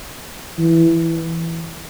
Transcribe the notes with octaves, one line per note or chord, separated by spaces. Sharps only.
E3